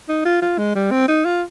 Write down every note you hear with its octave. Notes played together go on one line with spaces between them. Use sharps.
D#4
F4
F4
G#3
G3
C4
D#4
F4